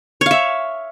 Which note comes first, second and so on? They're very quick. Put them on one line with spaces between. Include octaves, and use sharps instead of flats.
C#5 F5 E5